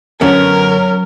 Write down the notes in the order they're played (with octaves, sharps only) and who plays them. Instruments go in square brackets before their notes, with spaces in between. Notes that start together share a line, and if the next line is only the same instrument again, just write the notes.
[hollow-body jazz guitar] F#2 D3 B3 [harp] F#3 [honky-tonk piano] C#4 [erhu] A#4